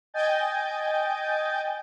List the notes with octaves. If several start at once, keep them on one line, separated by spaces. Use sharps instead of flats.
D#5 G5 G#5 G6 A6